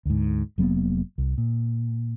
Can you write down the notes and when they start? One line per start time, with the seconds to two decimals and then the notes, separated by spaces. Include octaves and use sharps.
0.06 D2 G#2
0.58 F1 F#3 A#3 B3
1.18 C2
1.38 A#2